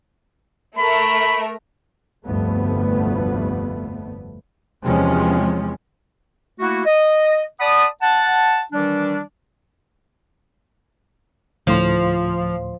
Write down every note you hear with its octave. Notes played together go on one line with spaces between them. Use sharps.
A3 A#4 B5
F1 D2 G2 F3 A3 B3
E2 C3 E3 F3 G#3 C#4
A3 A#3 E4 F#4
D#5
D5 F#5 A5 B5 D#6
F#5 A5
D#3 E3 G3 D4
D2 A2 F3 C6